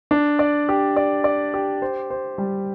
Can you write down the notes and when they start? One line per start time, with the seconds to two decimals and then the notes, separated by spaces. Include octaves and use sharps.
0.11 D4
0.39 D5
0.69 G4
0.96 D5
1.24 D5
1.54 G4
1.82 C5
2.10 C5
2.38 G3